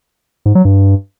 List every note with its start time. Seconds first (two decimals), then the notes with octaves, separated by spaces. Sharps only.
0.46 G#2
0.55 F#3
0.65 G2